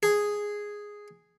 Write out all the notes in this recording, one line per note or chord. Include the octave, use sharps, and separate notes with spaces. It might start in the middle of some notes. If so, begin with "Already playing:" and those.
G#4